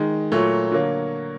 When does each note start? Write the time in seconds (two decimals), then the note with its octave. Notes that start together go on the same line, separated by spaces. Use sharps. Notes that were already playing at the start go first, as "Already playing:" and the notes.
Already playing: D#3 G#3
0.32 A#2 F#3 A3 C#5
0.72 D3 F#3 A#3